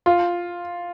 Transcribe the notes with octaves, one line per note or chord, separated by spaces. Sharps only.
F4